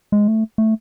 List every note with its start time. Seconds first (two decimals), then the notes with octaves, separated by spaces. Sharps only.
0.12 G#3
0.28 A3
0.58 A3